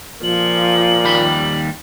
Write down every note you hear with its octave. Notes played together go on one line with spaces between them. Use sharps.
A#2 F3 F#7
D#2 G3 B5